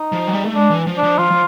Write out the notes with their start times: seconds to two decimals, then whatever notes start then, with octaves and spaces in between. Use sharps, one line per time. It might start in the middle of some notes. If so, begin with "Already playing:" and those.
Already playing: D#4
0.12 F3
0.27 F#3
0.33 G3
0.45 A3
0.55 G#3 D4
0.70 E3
0.87 F3
0.98 D4
1.03 F3
1.18 F3 F4
1.31 F3